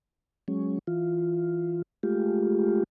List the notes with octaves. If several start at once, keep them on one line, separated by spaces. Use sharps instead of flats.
F#3 G#3 C#4
E3 F4
G#3 A3 F4 G4